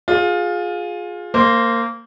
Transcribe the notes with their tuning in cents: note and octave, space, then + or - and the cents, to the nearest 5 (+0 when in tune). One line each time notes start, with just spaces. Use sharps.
F4 +20 G#4 +0
A#3 -20 C5 +0